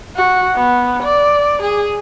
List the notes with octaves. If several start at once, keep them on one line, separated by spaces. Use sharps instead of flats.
F#4
B3
D5
G#4